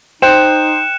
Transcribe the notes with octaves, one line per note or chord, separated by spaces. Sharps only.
D#4 C5 G5 F#6 C#7 E7